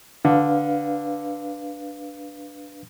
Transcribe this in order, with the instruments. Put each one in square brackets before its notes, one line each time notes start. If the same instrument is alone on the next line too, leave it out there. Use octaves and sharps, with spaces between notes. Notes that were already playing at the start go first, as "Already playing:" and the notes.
[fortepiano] D3 [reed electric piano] D4 B4 F5